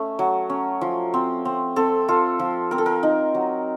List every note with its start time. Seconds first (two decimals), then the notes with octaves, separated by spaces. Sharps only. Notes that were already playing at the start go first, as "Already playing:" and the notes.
Already playing: A3 C#4
0.19 F#3
0.50 C#4
0.81 F3
1.14 C4
1.45 C4
1.76 C4 A4
2.08 F4 A4
2.39 F3
2.71 C4 A#4
2.78 A4
2.86 A#4
3.03 D#4
3.35 F#3